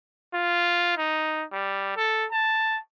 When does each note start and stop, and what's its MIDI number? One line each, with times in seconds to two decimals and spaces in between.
0.34 0.96 65
0.98 1.44 63
1.52 1.96 55
1.97 2.26 69
2.32 2.79 81